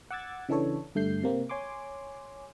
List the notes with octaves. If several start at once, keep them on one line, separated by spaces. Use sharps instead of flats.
F#5 D6 E6 G#6 A6
C#3 E3 D4 A4 C#5
G2 D3 A3 G6 C7
C3 A#3 C4
C#5 G#5 C6 D6